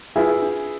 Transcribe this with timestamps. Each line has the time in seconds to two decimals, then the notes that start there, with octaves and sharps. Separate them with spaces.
0.16 E4 F4 G#4 B4 F5
0.42 D4